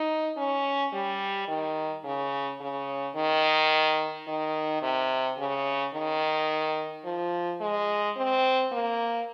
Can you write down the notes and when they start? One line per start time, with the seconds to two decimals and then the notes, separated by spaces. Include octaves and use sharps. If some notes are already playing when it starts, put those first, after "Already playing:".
Already playing: D#4
0.37 C#4
0.93 G3
1.48 D#3
2.04 C#3
2.60 C#3
3.16 D#3
4.28 D#3
4.82 C3
5.38 C#3
5.94 D#3
7.05 F3
7.61 G#3
8.17 C4
8.72 A#3